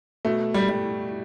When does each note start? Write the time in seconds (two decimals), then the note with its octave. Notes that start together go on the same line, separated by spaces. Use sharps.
0.25 B2 A3
0.54 G3
0.69 G3